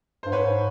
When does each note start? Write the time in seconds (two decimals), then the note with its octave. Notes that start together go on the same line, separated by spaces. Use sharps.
0.23 G2 C5
0.32 G#2 B4 C#5